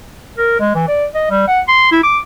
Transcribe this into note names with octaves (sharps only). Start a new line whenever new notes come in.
A#4
G#3
E3
D5
D#5
G3
F#5
C6
E4
D6